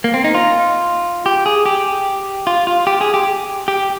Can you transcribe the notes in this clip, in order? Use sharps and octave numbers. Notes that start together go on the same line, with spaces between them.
A#3
C4
D#4
F4
G4
G#4
G4
F4
F4
G4
G#4
G4
G4